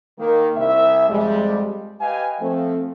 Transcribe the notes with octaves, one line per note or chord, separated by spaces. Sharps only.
D#3 A#3
C2 E5
F2 G3 G#3
G4 B4 D#5 F5 G5 G#5
F3 A3 C4